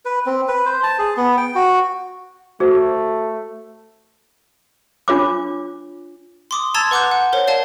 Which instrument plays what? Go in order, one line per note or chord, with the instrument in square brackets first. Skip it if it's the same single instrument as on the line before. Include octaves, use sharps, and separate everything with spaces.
[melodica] B4
C4
B4
C5
A5
G#4
B3
G5
F#4
[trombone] A3 [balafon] F#4 C5
[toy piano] D4 F4 C#5 D6
[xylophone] C6 D6 D#6
A5 A#5 C6 E6 G#6 A6
B4 F#5 D6 F#6 G6
F#5
A#4 C5 C#5
D5 F5 A5